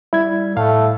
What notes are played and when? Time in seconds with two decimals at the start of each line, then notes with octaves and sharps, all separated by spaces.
0.13 G3 E4 G#6
0.57 A2 A3 F5